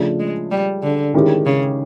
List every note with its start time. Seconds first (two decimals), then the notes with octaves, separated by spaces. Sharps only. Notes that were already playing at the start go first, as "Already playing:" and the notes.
Already playing: C#3 F3 A3 D4
0.20 G#3
0.51 G3
0.83 D3
1.14 D#3 G#3 C#4 E4 G4
1.46 C#3